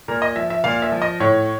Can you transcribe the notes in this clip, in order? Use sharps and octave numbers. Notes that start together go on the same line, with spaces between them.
A#2 A#4
D#5
F3 E5
E5
A#2 F5
E5
F3
D#5
A2 C#5